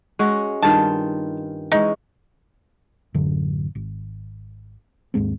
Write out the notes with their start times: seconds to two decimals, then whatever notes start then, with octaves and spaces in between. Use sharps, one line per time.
0.19 G#3 C#4 F#4
0.62 G2 D#3 F4 A5
1.72 E3 G#3 C#4 D#4
3.14 A1 F#2 D3
3.75 G#1
5.14 D#2 G#2 G#3 C4